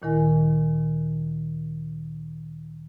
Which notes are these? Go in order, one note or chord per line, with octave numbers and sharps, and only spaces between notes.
D2 A#2 D#3 E4 A#4 G#5